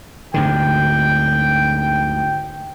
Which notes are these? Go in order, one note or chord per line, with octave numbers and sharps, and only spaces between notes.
D2 G#2 D3 G5